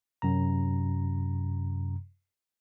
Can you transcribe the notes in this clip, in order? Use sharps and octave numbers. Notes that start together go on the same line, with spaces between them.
F#2 C3 A#5